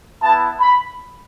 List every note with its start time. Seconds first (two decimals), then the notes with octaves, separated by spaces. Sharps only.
0.22 B3 E4 A5
0.60 B5